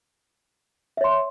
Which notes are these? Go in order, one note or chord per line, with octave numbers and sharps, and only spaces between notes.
C#5 E5 C6